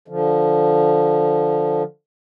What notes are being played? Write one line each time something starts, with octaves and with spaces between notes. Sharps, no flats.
D3 F3